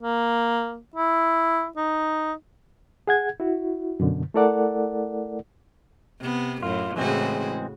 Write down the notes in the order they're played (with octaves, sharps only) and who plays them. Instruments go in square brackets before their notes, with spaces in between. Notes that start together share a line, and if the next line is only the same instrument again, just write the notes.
[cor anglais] A#3
E4
D#4
[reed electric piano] G#4 F#5 G#6
E4 F#4
F#2 B2 D3
A3 E4 A4 A#4 D5 F#5
[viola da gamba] C3 B3
[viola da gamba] F#2 A2 [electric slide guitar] F4
[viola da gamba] A2 C#3 F#4 [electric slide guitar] E3 G#3 C4